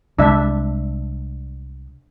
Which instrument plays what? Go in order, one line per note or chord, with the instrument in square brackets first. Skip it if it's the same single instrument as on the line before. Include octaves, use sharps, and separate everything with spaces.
[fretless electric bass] C2 G#3 [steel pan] D4 E5